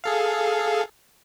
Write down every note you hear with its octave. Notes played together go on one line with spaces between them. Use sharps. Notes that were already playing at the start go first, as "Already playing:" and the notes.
G#4 A4 F5